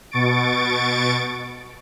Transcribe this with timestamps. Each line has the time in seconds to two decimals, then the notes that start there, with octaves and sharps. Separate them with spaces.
0.11 B2 C#6 A6 D7